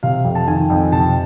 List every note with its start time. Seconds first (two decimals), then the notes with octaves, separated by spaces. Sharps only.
0.03 C3 F5
0.24 F2
0.35 A5
0.47 D#3 G#5
0.70 F2
0.92 C3 A5